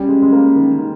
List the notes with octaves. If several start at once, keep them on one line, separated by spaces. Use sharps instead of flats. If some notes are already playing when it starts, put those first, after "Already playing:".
Already playing: G3 C#4
G#3
G#3
A#3
D#3
D#3